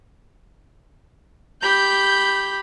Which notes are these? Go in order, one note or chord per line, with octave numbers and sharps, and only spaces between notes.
G4 B5 G6